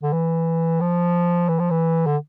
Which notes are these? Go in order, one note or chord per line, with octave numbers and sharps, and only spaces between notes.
D3
E3
F3
E3
F3
E3
D3